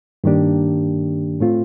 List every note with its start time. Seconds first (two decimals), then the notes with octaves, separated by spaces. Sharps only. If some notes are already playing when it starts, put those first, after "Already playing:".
0.24 G2 D#3 A#3 D4 G4
1.40 A2 A3 C4 F4